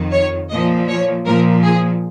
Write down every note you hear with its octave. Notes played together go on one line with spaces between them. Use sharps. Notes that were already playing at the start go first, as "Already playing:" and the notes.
Already playing: F2 D#3
C#5
A#2 F3 D#5
C#5
A#2 F3 A#4
G#4